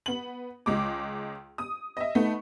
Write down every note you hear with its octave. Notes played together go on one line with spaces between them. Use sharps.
B3 F#7
C#2 G#3 D6
D#6
D#5 E5
A3 B3 D#4